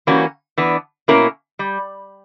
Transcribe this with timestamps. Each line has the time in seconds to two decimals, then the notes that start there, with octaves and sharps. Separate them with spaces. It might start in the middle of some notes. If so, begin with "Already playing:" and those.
0.07 E3 G3 A#3 C#4 F#4
0.58 E3 B3 D4
1.08 B2 A#3 C#4 E4 A#4
1.59 G3